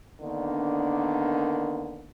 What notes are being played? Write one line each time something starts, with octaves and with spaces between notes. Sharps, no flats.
D3 D#3 A#3 B3 D4